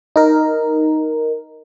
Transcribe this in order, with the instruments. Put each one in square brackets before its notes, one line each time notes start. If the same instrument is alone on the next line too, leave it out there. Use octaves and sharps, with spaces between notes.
[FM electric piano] D#4 A#4